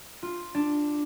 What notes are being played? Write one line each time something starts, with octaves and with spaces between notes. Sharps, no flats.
F4
D4